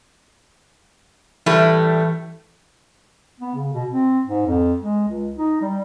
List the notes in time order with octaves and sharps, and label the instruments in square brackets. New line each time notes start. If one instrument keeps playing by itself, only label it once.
[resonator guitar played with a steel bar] A2 G3 A3 [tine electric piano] E3
[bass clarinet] B3
C#3
B2
C4
G#2
F2
G#3
C#2
D#4
G3